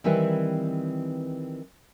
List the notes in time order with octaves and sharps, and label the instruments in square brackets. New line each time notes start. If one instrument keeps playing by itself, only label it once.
[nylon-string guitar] D#3 E3 G3 C4 E4 B4